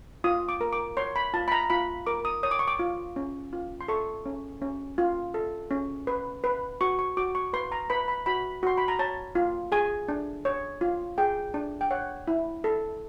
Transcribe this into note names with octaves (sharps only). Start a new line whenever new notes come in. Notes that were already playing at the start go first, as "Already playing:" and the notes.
F4 D#6
D6
A#4
D6
C#5 C6
B5
F4 A5
B5
A#5
F4 B5
A#4 D6
D#6
C#5 D#6
D6
C#6
D6
F4
C#4
F4
C6
A4 C#6
C#4
C#4
F4
A4
C#4
B4
B4
F#4 C#6
C#6
F#4 D6
C#6
B4 C6
A#5
B4 B5
B5
F#4 B5
F#4 C6
B5
A#5
C#5 A5
F4
G#4 G#5
D4
C#5
F4
G#4 G5
D4
G5
C#5 F#5
E4
A4